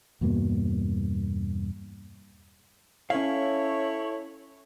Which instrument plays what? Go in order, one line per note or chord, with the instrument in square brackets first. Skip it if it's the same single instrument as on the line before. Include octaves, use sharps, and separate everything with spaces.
[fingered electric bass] E2 G2 B2 A#3
[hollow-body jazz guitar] C#4 F5 [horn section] E4 A4 C#5